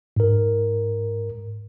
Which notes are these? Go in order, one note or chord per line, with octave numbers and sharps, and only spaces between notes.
G#2 A#4